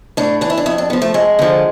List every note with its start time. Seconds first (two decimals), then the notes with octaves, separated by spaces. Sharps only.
0.17 A2 D4
0.41 E3 D4
0.50 E4
0.57 D4
0.66 F2 E4
0.78 D4
0.90 D3 F3 B3
1.02 A3
1.14 F2 G#3
1.39 D3 F3